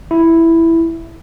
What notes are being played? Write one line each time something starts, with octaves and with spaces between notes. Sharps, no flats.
E4